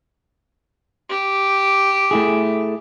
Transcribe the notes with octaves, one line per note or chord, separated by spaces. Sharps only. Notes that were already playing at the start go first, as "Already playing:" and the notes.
G4
A3 E4 G#4